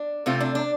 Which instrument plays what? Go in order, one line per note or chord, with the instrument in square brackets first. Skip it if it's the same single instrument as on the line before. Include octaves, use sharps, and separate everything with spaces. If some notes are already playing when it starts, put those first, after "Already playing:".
Already playing: [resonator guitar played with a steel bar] D4
C3 A3 C4 F4
D4
D4